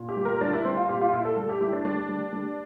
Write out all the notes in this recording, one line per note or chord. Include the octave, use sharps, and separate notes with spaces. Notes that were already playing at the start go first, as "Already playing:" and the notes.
Already playing: A#2
G4
G3
A#4
G3 D4
E4
G3 C4
F4
A#2 G4
F4
A#2 E4
A4
G3 A4
G4
G3 E4
D4
G3 D4
G3
G3